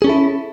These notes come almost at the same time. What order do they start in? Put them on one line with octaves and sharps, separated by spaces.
G#4 C#4 A4 E4